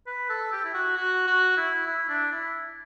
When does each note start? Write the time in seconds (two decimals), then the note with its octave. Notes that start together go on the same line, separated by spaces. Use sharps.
0.06 B4
0.29 A4
0.52 G4
0.64 E4
0.74 F#4
0.97 F#4
1.27 F#4
1.57 E4
1.87 E4
2.09 D4
2.31 E4